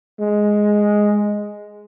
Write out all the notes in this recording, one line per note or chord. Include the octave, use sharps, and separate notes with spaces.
G#3